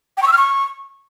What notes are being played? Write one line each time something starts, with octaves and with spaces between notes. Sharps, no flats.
G5
C#6
E6
F6
C#6